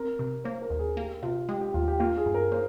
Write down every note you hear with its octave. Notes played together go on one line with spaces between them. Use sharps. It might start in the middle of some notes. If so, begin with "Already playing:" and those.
Already playing: C4 A#4
C3
A#3 C5
A#4
D#2
G#4
A#3 G4
C3 F4
G#3 G4
G4
D#2 F4
G4
A#3 F4
G#4
G2
A#4
A#3 C5